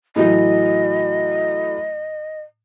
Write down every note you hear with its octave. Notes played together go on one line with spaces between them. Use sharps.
A2 E3 F#3 D#5